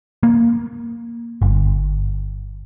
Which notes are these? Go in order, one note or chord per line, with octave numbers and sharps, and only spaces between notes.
A#3
G1